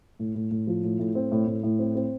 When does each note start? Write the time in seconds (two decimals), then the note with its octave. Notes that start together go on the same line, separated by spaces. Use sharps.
0.19 A2
0.35 A2
0.51 A2
0.67 F3
0.83 A2
0.99 A2
1.15 C4
1.32 A2
1.47 A2
1.63 A2
1.79 C4
1.95 C4